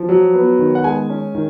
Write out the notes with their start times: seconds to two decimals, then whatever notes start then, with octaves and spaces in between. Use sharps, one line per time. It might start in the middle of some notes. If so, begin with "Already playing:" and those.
Already playing: F3
0.09 F#3
0.34 B3
0.59 D#3
0.75 F#5
0.84 G#3 G#5
1.10 C#4
1.35 D#3